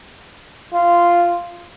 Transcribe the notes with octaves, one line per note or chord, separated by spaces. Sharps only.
F4